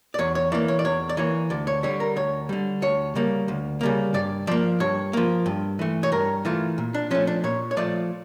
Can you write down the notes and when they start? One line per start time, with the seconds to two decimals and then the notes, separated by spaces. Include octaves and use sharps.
0.14 D5
0.19 E2 C#5
0.35 C#5
0.52 E3 A#3 D5
0.68 C#5
0.79 D5
0.85 E2 C#5
1.09 D5
1.17 E3 A#3 C#5
1.50 D2 D5
1.67 C#5
1.83 D3 G3 C#5
2.00 A#4
2.16 D2 C#5
2.49 D3 G3
2.82 D2 C#5
3.15 C#3 G3 A#3
3.48 D2
3.81 C#3 G3 A#3
4.14 G2 D5
4.47 F3 A#3 D5
4.80 G2 C#5
5.13 F3 A#3
5.46 G2
5.79 E3 A3
6.03 C#5
6.12 G2 A#4
6.45 E3 A3 F4
6.78 A#2
6.94 D4
7.11 F3 A3 C#4
7.27 D4
7.44 A#2 C#5
7.71 C#5
7.77 F3 A3 D5